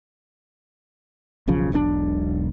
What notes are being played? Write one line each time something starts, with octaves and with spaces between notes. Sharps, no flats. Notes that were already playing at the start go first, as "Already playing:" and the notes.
E1 B1 C#3 F3
E1 B1 C3 D4